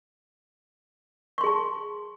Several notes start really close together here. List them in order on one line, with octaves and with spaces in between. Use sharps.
C#6 C6 G#4 A5